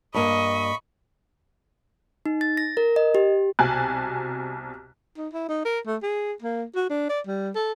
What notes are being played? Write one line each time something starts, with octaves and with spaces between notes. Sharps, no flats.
G2 A#3 D#5 B5 C#6
D#4
A6
A#6
A#4
D#5
G4
C2 B2 G#5 A5 F#6
D#4
E4
D#4
A#4
A3
G#4
A#3
F#4
D4
D5
G3
A4